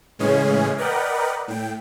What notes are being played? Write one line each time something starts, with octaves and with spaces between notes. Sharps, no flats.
A2 C#3 E3 G#3 C#4 G#4
A#4 B4 D5 D#5 F#5 G5
A2 G5